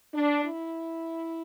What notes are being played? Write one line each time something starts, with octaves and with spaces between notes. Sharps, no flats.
D4
E4